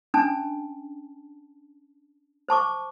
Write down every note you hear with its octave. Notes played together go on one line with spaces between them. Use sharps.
C#4 D4 G#5 A5
C5 A5 C#6 D6